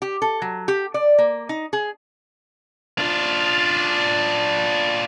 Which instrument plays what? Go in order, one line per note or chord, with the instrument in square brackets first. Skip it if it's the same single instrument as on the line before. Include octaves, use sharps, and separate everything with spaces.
[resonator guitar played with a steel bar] G4
A4
F#3
G4
D5
A#3
D#4
G#4
[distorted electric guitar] D4 F4